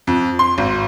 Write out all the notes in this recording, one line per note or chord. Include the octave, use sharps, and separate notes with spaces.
F2
C6
G#1